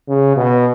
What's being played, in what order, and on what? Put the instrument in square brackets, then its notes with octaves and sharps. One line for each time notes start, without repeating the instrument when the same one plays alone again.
[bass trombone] C#3
B2